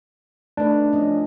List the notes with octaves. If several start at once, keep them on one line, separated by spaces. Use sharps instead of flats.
A3 D4 D#4 B4
F3 C#4 D#5